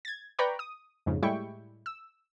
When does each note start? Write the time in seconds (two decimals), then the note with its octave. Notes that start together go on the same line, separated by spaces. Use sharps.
0.05 G#6 A6
0.39 B4 D5 G5 A#5 B5 C#6
0.59 D#6
1.06 F2 G#2 C#3
1.22 A2 G3 G#3 E4 G5 C#6
1.86 E6